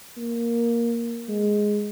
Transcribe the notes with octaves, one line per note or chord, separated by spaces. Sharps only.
A#3
G#3